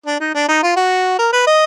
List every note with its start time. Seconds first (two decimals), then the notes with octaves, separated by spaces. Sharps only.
0.06 D4
0.20 D#4
0.34 D4
0.48 D#4
0.63 F4
0.76 F#4
1.19 A#4
1.33 B4
1.47 D#5